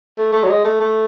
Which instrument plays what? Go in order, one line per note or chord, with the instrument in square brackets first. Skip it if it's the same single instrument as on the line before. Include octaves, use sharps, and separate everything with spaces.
[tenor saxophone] A3
A3
F#3
G#3
A3
A3